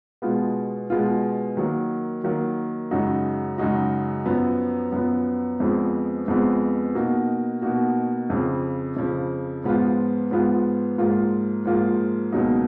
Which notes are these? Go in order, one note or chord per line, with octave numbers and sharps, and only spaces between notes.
B2 G#3 B3 F4
B2 G#3 B3 F4
D#3 F#3 A#3
D#3 F#3 A#3
F#2 C#3 G#3 D#4 F#4
F#2 C#3 G#3 D#4 F#4
F#2 F3 B3
F#2 F3 B3
F2 F3 G#3 B3
F2 F3 G#3 B3
B2 A#3 D#4 F#4
B2 A#3 D#4 F#4
F2 C#3 F3
F2 C#3 F3
G#2 F3 B3 F4
G#2 F3 B3 F4
G#2 F3 A#3 F4
G#2 F3 A#3 F4
C#2 B2 F#3 A#3 D#4